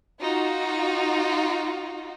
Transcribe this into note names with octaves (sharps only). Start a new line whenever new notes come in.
D#4 F4 F#4